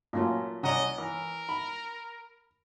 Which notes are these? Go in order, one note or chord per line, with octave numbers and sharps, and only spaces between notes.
A#2 F#3 A3 A#3 C#4 F4
C2 C#4 D5 D#5 F#5 A#5
E3 A#4
B5